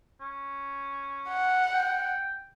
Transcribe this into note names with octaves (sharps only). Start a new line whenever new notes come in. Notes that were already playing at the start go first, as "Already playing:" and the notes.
C#4
F#5
G5